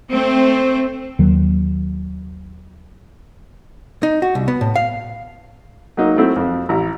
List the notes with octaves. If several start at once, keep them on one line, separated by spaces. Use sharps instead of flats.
A3 C4
D#2 D#3 F#3
D#4
F#4
C2
B3
A2
F5
F#3 A#3 D#4
F#3 A3 C4 E4
F2
A1 E4 A#5